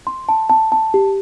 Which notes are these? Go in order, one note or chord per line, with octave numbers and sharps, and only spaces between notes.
C6
A5
A5
A5
G4